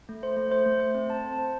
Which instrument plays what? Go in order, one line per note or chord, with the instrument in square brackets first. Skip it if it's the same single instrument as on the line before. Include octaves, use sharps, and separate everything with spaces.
[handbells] A3
C5
A3
C5
A3
C5
C4
A5
C5
C5